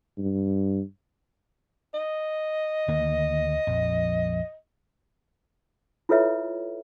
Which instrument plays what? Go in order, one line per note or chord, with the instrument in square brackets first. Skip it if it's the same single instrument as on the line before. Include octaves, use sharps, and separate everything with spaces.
[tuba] G2
[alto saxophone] D#5
[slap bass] D2 D#3 A#3
A#1 F2
[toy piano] E4 F4 A4 B4 C#5 E5